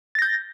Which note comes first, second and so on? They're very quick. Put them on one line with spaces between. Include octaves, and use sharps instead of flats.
A6 A#6 G6